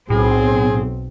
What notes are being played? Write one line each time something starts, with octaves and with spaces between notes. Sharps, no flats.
B1 A2 C4 G#4